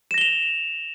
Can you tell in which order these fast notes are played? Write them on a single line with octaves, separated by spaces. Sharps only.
E7 A#6 G7 F7